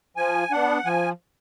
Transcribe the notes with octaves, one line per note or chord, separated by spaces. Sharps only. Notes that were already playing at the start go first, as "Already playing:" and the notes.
F3 G#5
B3 D4 F#5
F3 G#5